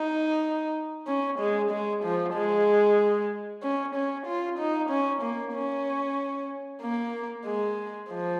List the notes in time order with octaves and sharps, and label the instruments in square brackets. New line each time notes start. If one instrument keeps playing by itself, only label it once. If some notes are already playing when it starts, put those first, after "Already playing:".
Already playing: [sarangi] D#4
C#4
G#3
G#3
F3
G#3
C#4
C#4
F4
D#4
C#4
A#3
C#4
A#3
G#3
F3